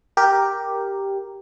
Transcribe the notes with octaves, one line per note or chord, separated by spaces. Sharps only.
G4 A#4